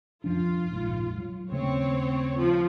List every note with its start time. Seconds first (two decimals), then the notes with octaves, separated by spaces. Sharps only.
0.24 F2 F3 D4 F4
0.69 F1 A#1 G#2
1.18 F#3
1.51 D#2 C#3 A3 C4 C#5
2.37 F3 F4